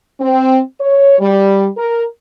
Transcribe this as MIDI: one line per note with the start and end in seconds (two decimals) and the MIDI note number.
0.20 0.59 60
0.80 1.18 73
1.19 1.67 55
1.77 2.04 70